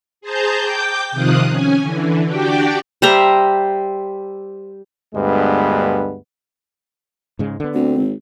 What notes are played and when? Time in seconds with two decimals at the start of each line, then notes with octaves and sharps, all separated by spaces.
0.21 G#4 C5 A5 A#5 G6
0.59 G5 D6 G6
1.11 C3 D#3 F3 F5 D#6 F#6
1.51 C#4 G#5
1.81 D3 E3
2.26 D4 F#4 G4 D5 G5
3.02 G3 C5 E5 A#5
5.15 D2 G2 G#3 B3
7.39 G#2 C#3 G#3
7.60 D3 B3
7.74 D2 C4
7.98 G#1